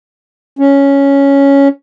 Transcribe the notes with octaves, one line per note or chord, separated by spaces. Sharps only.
C#4